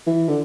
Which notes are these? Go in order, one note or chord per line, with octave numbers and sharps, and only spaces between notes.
E3
D3